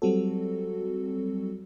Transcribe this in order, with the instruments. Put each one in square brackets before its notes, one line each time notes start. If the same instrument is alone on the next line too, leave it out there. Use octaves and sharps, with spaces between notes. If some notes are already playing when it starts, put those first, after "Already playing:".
[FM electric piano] F#3 G3 C4 F#4 A4